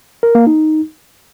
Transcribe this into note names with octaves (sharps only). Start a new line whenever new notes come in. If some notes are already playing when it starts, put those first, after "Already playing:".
A#4
A#3
D#4